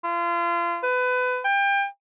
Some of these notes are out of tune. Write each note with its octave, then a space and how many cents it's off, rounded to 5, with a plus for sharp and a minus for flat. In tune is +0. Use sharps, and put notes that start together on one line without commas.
F4 -30
B4 +25
G5 +30